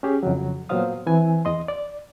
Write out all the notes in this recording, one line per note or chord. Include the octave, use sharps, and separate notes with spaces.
C#4 G4 G#4
F2 C#3 F#3
A#2 F#3 B3 C5 F5 D#6
E3 C4 G#5
E2 D#5 C6
D5